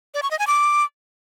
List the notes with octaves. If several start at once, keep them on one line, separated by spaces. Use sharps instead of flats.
D5
C#6
D#5
G#5
D6